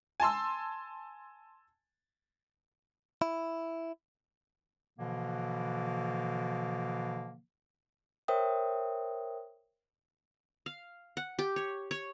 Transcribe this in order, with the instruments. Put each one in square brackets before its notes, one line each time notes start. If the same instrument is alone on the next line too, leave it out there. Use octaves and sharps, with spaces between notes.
[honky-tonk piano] G#5 A5 C6 E6
[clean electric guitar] E4
[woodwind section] B2 D3 E3 F3 A#3
[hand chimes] A#4 C5 C#5 E5 G5 D#6
[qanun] F5
F#5
G4
C#5
C#5